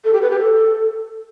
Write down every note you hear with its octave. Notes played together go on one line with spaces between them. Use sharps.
A4
G4
B4
G4
A4